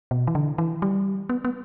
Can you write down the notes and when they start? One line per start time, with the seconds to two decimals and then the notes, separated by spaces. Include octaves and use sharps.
0.11 B2
0.27 E3
0.35 D3
0.58 E3
0.82 G3
1.29 B3
1.45 B3